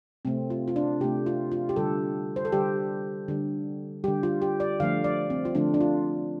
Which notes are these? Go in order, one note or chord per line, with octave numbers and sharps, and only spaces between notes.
C3 A3 C4
F4
F4
D4
C3 A3 G4
F4
F4
G4
D3 G3 A4
C5
A4
D3 G3 G4
D3 G3
D3 G3 G4
F4
G4
D5
D3 F3 A3 F5
D5
C4
F4
D3 F3 A3 D4
D4
F4